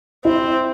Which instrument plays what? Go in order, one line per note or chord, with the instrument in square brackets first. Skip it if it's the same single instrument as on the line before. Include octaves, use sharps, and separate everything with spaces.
[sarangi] C4 [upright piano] E4